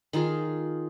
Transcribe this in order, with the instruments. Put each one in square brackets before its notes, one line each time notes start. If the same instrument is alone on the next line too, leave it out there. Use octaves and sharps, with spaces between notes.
[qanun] D#3 D#4 F4 G#4